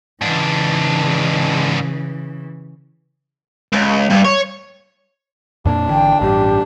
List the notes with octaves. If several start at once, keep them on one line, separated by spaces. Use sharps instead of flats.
G#2 C#3 E3 D4
C#2
G2
C#5
F2 A#2 A#3 D4
G#1 D3 E3 G5
A1 G2 G4